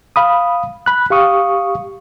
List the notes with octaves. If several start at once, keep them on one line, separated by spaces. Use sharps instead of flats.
F5 B5 D#6
B5 F#6
G4 F5 C#6 D#6